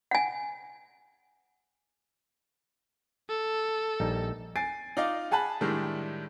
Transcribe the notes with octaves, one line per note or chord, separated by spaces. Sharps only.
F#5 G#5
A4
A#1 G3 D#4
G#5 A6 C7 D7
D#4 F4 D5 D#5 F5
G#4 F#5 G#5 A5 B5
A2 D#3 G3 G#3 D4 E4